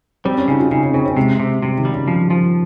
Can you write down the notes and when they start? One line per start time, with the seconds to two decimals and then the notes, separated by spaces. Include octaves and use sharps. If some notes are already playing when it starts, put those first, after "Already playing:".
0.25 G3 C4
0.37 C#4
0.48 C#3 D#4
0.59 F4
0.71 C#3 D#4
0.83 C#4
0.94 C#3 C4
1.05 C4
1.16 C3 G#3
1.40 C3
1.62 C3 G3
1.78 D#3
1.85 G3
1.92 C#3
2.08 F3
2.30 F3